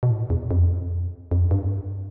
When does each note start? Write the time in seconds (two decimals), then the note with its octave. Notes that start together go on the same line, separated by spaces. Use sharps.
0.03 B2
0.10 A2
0.30 E2
0.51 F2
1.31 F2
1.51 G2